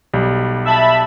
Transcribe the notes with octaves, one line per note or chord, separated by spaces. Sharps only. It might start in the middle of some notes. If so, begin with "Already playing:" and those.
B1 G3
E5 A5 B5